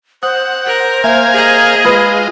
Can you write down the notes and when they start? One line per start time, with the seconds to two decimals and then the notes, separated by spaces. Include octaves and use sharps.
0.23 C5 F#5 D#6
0.66 A#4
1.04 A#3 E5 F5 G#5
1.34 G#4 D#5
1.84 G#3 F4 B4 B5 D#6